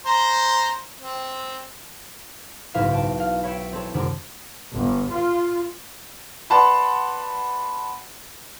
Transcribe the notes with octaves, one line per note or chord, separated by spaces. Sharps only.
C5 A#5
C4
F#1 B1 G#2 E4 E5 F5
G5 A5
F5
E4 C#5 E5 G5
C4 A4 C#5
F#2 C3 D#3 G#3 D4
G1
F4
B4 D5 F#5 A5 B5 C6